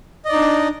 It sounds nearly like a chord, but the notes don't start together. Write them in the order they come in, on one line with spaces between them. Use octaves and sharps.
D#5 D5 D#4 D4